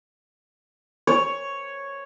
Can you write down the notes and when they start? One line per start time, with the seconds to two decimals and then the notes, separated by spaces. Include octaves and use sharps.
1.07 C#5